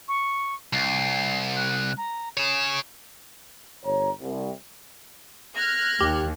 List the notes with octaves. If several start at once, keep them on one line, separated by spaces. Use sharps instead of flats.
C#6
C2 C7
F#6
A#5
G#4 C#5 E7
G1 C#5 A#5
C2
F6 F#6 G#6 A#6
D#2 G4